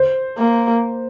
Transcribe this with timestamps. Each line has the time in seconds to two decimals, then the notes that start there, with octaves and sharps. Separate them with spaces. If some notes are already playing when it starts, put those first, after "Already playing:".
Already playing: C5
0.38 A#3